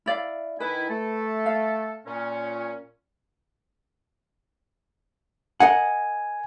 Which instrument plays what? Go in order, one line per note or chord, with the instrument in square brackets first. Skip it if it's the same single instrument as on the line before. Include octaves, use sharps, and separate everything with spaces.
[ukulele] E4 D5 F5
[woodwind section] D#3 E4 G#5 [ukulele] B4
[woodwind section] A3 A4
[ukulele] F5
[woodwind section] A#2 C#4
[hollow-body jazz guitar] A#4 D#5 F#5 [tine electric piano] G#5